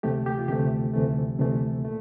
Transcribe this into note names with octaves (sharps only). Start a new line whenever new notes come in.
D2 C3 E3 A3 G4
G4
F4
D2 C3 E3 A3 G4
D2 C3 E3 A3
D2 C3 E3 A3
A#2 A3